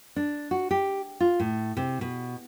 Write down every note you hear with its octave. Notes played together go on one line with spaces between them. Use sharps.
D4
F#4
G4
F4
A2
C3
B2